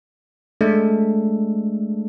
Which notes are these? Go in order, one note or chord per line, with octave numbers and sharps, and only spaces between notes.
G#3 A3 D4 A4